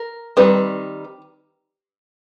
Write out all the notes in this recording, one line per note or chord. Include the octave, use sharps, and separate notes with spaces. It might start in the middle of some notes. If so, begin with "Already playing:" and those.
Already playing: A#4
D#3 G3 C4 B4